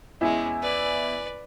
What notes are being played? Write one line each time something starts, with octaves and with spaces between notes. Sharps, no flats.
E2 G#3 C#4 E4
B4 D5